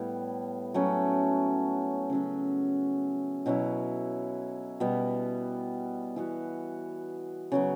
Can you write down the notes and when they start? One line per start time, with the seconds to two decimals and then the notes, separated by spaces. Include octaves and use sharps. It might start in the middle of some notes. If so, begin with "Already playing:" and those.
Already playing: A2 G3 B3
0.74 F#3 A3 C#4
2.10 C#3 F#3 C#4
3.46 B2 F#3 C#4 E4
4.80 B2 G3 B3
6.16 E3 B3 F#4
7.52 C#3 F#3 B3